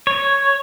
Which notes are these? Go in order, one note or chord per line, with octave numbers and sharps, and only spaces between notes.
C#5